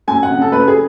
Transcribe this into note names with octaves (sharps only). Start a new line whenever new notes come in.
F#2 G#5
F#5
C#3
A4
F#2 B4
G#4